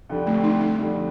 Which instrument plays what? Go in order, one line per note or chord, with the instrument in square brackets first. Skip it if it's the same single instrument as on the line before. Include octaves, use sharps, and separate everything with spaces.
[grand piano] F2 D3 G3 D4
[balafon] A3
D#4
D#4
[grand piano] F2 D3 G3 D4